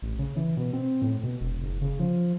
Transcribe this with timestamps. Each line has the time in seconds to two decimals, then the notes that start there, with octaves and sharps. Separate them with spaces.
0.02 A1
0.19 C#3
0.36 E3
0.57 B2
0.73 C4
1.02 A2
1.24 B2
1.41 E1
1.62 F#1
1.82 C#3
2.00 F3